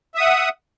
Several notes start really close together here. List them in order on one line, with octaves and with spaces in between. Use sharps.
E5 D#6 F#5